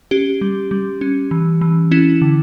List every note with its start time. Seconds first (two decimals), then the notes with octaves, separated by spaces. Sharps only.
0.11 C#4 G4
0.41 G3
0.71 G3
1.01 C#4
1.31 E3
1.61 E3
1.91 C#4 E4
2.22 D3